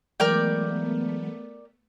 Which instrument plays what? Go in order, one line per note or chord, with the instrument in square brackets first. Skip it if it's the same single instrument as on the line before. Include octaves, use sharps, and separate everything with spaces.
[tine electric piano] E3 F#3 G#3 [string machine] A3 B3 [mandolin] A#4 D5 G5